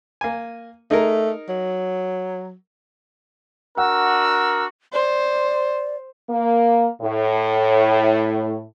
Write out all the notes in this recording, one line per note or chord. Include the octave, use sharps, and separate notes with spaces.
A#3 G#5
A3 D#4 G#4 A#4
F#3
D4 F#4 A#4 F#5 E6
C5 D5
A#3
A2